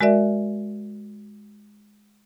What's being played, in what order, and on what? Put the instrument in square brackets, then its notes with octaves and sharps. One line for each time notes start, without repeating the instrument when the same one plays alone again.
[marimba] G#3 F#4 A#4 D5 E5